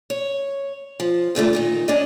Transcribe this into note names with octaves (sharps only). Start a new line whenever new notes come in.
C#5
F3
E2 A#2 D3 A3
A#2 D#3 D#4
C#4 D4 D5 D#5